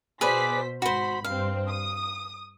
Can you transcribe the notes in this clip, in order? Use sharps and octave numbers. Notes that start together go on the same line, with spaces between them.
B2 G#4 B4 C5 D5 B6
G#1 F#4 C5 B5
G2 C4 F5
D#6